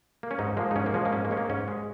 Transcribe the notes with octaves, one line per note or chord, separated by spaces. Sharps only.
A#3
C#4
G#2 D#4
F3 G#3 A#3
D#4
G#2 C#4
A#3
F3 G#3 C#4
A#3
G#2 C#4
A#3
G#3 C#4
A#3
G#2 C#4
G#3